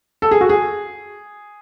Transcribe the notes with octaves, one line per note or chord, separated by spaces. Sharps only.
A4
G#4
F#4
G#4